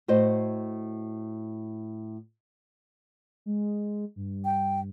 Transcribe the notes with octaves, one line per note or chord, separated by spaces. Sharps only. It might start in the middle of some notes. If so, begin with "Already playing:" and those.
A2 F#4 C5 D#5
G#3
G2
G5